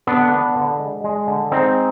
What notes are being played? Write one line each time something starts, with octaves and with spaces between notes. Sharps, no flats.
D3 B3 D4
B3
D3
G#3
G#3
D3
G#3 C4 D#4